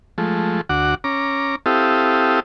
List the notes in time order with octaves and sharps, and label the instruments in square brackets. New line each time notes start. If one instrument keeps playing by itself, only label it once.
[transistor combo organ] F3 G#3 A3
D2 F#4 F#5 D6
C#4 A#5 D6
C4 E4 G4 A4 F5 D#6